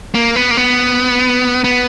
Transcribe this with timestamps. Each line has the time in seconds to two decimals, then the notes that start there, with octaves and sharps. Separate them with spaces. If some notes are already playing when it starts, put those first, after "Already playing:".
0.15 A#3
0.36 B3
0.51 A#3
0.57 B3
1.64 B3